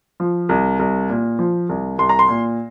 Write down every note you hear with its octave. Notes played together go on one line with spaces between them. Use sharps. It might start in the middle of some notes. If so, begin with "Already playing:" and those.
F3
C2
C2
A#2
F3
C2
C2 C6
A#5
C6
A#2